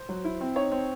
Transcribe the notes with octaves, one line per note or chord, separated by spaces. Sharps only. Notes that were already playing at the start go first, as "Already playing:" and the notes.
Already playing: C5
F#3
E4
C4
D#4 C#5
C4